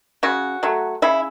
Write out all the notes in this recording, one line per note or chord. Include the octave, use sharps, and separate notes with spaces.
C#3 F#4
F#3 A3
C#3 E4